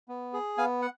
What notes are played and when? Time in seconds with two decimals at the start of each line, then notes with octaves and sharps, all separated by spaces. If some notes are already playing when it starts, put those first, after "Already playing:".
0.08 B3
0.33 G#4
0.57 B3 F5 G#5
0.82 F#5